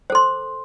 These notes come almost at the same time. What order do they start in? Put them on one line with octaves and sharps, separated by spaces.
C5 A4 C6